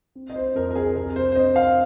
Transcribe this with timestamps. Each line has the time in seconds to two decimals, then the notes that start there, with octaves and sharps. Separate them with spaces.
0.15 C4
0.30 D#5
0.36 C5
0.55 F2 A#4
0.71 A#4
0.75 G#4
0.96 C3 A#4
1.16 C5
1.32 C5
1.36 C4 D#5
1.56 F5